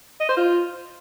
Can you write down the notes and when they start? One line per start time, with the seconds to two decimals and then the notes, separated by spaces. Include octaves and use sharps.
0.20 D#5
0.28 C5
0.37 F4